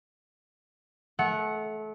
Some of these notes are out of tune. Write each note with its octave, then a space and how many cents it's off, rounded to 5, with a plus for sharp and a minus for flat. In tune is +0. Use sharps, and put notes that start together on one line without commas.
A3 -30 F#5 +0